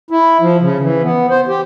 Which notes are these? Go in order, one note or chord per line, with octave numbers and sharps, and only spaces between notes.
E4
F3
C#3
E3
B3
C5
G4